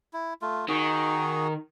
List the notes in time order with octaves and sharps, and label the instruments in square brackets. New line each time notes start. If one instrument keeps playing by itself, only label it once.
[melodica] E4
A3 F4
[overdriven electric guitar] D#3 [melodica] F#4 G#4